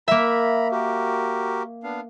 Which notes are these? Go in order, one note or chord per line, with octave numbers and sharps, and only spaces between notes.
A#3 E5 A#5 B5
F#4 G4 A#4
B3 D4 F5